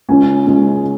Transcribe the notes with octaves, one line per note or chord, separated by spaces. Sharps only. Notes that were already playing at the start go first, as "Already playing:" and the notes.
C#2 C#3 G#3 C#4 G#5
C#2 C#3 G#3 C#4